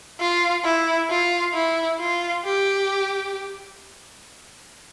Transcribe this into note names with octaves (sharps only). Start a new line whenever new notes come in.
F4
E4
F4
E4
F4
G4